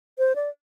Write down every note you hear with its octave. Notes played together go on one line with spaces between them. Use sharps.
C5
D5